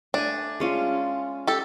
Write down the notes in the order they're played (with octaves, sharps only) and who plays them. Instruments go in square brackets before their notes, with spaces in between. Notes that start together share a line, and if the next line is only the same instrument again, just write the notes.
[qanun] A3 G#5 [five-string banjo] D4
[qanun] G#3 C#4 F4
[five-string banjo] G4 A4